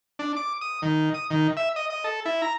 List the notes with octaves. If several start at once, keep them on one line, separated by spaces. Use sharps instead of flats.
D4
D6
D#6
D#3
D#6
D#3
E5
D#5
D#5
A4
E4
A#5